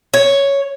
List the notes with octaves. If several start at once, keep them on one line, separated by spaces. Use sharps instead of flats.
C#5